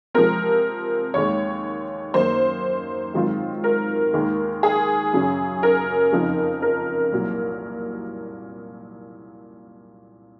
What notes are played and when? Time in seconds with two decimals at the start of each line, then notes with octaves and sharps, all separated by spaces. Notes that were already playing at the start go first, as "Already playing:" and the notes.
0.14 C3 F3 G#3 C4 A#4
1.14 D#2 D#3 G#3 C#5
2.14 F#2 D#3 A#3 D#4 C5
3.14 G#2 D#3 F#3 C4 F4
3.64 A#4
4.13 D#2 D#3 G#3
4.63 G#4
5.13 F#2 C#3 F#3 C#4
5.63 A#4
6.12 F2 C#3 F3 C4 D#4
6.62 A#4
7.12 C2 A#2 F#3